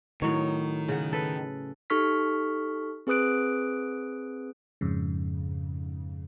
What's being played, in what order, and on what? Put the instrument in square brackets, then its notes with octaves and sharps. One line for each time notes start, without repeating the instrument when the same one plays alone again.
[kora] A2 F#3 C#5 [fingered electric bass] D#3
[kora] C#3 F#5
A4 B4
[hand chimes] D#4 G4 A4 C#6 F6 B6
C4 G#4 B4 D#6 F#6 D7
[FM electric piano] F2 G#2 C#3